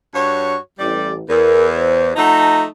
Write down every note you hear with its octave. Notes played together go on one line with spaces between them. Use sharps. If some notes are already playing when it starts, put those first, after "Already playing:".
G2 F#4 C#5
A1 G3 D5
E2 A#4
B4 C5
F3 A3 D#4 F#5 A5 A#5